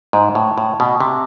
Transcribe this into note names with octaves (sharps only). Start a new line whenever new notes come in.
G#2
A2
A2
B2
C3